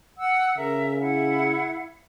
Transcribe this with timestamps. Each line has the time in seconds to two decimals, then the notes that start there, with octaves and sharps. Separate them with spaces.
0.18 F#5 E6
0.58 C#3 A#4 E5
0.99 E4 E5 F#5